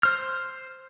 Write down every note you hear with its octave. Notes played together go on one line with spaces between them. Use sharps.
C5 F6